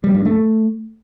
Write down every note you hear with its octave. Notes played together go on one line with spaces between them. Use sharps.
G3
G2
A3